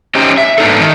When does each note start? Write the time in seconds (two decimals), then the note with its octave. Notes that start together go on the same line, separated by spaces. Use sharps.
0.15 C#4 D#4 G4 C5
0.38 E5
0.58 G#2 B3 D4 D#4 G#4 A4
0.80 D#3